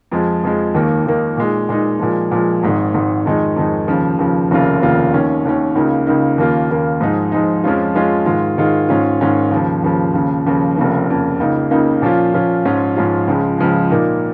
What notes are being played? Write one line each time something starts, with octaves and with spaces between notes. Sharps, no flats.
F2 F3 G#3
F2 F3 G#3
D#2 D#3 A#3 D#4
D#2 D#3 A#3 D#4
A#2 G#3 D#4
A#2 G#3 D#4
A#2 F3 G#3
A#2 F3 G#3
G#1 G#2 D#3
G#1 G#2 D#3
F2 D#3 G#3 D#4
F2 D#3 G#3 D#4
D#2 C#3 F3
D#2 C#3 F3
F1 D#2 C#3 A#3 F4
F1 D#2 C#3 A#3 F4
D#2 D#3 C#4
D#2 D#3 C#4
C#2 C#3 A#3 D#4
C#2 C#3 A#3 D#4
D#2 C#3 A#3 F4
D#2 C#3 A#3 F4
G#2 F3 G#3 D#4
G#2 F3 G#3 D#4
F2 F3 G#3 C#4 F4
F2 F3 G#3 C#4 F4
G#2 D#3 G#3 F4
G#2 D#3 G#3 F4
G#2 D#3 C#4 F4
G#2 D#3 C#4 F4
D#2 C#3 F3
D#2 C#3 F3
D#2 C#3 F3
D#2 C#3 F3
F1 F2 C#3 A#3
F1 F2 C#3 A#3
C#2 C#3 A#3 D#4
C#2 C#3 A#3 D#4
A#2 F3 C#4 F4
A#2 F3 C#4 F4
G#2 F3 C#4 F4
G#2 F3 C#4 F4
C#2 C#3 F3 G#3
C#2 C#3 F3 G#3
A#2 A#3 D#4